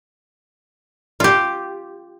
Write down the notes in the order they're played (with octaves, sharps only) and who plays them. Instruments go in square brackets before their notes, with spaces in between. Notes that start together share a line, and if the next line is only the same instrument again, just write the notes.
[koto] F4 G4